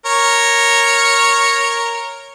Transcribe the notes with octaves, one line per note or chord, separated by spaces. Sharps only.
A#4 C#5